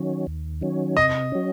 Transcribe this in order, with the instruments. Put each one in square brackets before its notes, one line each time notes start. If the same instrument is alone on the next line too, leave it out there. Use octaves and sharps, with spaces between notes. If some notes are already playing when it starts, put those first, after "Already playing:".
Already playing: [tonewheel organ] D#3 F#3 C#4
D#2
D#3 F#3 C#4
[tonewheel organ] C3 [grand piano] D#5
[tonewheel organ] F#3 C#4